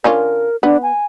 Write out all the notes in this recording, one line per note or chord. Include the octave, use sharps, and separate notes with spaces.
D3 C#4 F4 A#4
B3 D4
G#5